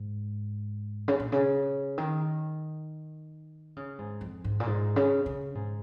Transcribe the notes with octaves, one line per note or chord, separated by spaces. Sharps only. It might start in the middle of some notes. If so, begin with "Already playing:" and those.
Already playing: G#2
C#3
A#2
C#3
D#3
C#3
G#2
F2
G#2
A#2
G#2
C#3
C#3
G#2